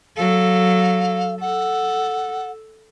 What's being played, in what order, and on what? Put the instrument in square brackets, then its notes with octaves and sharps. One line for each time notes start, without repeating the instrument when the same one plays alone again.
[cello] F#3 A4 [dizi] F5
[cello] A4 [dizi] F#5